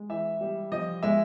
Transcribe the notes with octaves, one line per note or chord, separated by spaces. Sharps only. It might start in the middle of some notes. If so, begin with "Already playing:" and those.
Already playing: G#3
E3 E5
G3
F3 D#5
G#3 E5